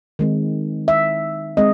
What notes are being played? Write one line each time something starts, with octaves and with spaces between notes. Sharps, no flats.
D#3 G#3 C4
E5
G#3 C4 D#5